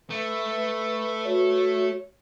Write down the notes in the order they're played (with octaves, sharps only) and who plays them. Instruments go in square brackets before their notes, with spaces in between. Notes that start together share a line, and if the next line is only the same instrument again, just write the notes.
[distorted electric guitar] A3 [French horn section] B4
[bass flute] F#4 [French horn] C#5